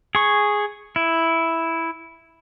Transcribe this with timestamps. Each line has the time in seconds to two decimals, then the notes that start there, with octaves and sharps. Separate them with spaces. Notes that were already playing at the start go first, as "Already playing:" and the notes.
0.15 G#4 C#6
0.96 E4